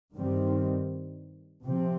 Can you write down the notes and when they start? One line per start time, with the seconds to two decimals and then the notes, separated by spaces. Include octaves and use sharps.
0.14 G2 D#3 G3 C4
1.64 C3 F3 C4